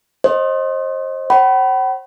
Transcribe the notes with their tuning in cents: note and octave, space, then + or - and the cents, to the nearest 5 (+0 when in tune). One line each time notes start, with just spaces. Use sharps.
C5 +30 D#5 +0
C5 +40 F#5 +45 B5 +0